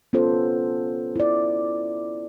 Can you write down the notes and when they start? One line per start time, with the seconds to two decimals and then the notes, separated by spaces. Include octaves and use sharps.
0.13 B3 C#4 F4 A4 C5
1.16 E4 D5